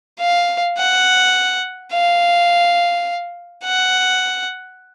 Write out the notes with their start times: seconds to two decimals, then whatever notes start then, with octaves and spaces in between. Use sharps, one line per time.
0.20 F5
0.78 F#5
1.93 F5
3.64 F#5